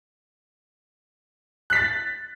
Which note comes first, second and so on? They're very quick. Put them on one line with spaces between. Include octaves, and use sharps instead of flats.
F#6 B6 A6